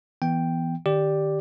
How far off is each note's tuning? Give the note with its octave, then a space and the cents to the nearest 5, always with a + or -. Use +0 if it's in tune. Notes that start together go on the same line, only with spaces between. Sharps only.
E3 +0 B3 +0 G5 +0
D#3 -35 G4 +0 D5 +0